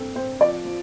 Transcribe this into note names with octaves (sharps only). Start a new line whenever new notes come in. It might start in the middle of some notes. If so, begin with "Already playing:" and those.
Already playing: G2 C4 A4
C4 C5
F3 D5
F3